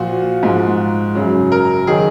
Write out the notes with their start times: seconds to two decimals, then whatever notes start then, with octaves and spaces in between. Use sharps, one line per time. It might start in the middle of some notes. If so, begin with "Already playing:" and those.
Already playing: A#2 F3 F#4
0.43 G#2 F3
1.15 F#2 C#3 F#3
1.52 A#4
1.87 D#3 F#3 G#4